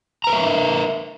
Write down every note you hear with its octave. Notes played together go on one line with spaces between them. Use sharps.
A#4 B4 E5 A#5